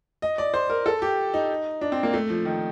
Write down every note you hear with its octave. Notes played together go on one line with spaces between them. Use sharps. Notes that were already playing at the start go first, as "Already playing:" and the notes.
D#5
D5
C5
A#4
A4
G4
D#4
D4
C4
A#3
A3
F3
D#3